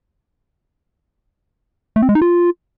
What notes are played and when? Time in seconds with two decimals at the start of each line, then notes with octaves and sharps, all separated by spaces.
1.96 A3
2.02 C4
2.09 G#3
2.15 D#4
2.22 F4